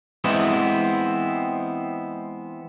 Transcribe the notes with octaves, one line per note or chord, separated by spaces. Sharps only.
E3 G#3 B3 C4 E4